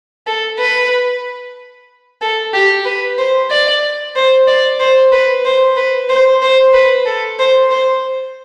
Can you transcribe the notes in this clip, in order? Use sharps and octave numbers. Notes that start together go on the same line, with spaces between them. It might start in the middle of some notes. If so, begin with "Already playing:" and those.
A4
B4
A4
G4
B4
C5
D5
C5
D5
C5
B4
C5
B4
C5
C5
B4
A4
C5
C5